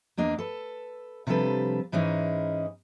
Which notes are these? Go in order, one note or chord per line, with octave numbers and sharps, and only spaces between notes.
E2 A#3 D4 D#5
A4 B4
C3 F3 G3 D4 A4 B4
G#2 E3 G#3 C#4 D#4 E4